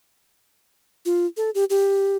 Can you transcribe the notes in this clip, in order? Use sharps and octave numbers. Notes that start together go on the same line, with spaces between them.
F4
A4
G4
G4